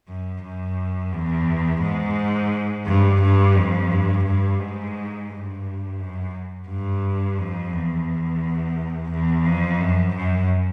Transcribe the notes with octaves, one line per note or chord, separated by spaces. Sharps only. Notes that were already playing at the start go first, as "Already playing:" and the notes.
F#2
F#2
E2
G#2
G2
G2
F2
G2
G2
G#2
G2
F#2
G2
F2
E2
E2
F2
F#2
F#2